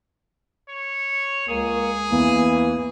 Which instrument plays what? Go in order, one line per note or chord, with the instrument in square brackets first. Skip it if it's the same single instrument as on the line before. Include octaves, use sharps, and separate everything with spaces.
[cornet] C#5
[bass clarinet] C#2 [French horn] A#3 [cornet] G#4
[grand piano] E2 [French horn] E3 [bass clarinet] A#3